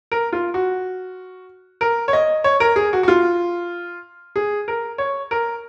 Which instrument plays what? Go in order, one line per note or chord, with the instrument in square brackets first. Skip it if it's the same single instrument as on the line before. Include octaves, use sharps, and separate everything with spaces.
[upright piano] A#4
F4
F#4
A#4
C#5
D#5
C#5
A#4
G#4
F#4
F#4
F4
G#4
A#4
C#5
A#4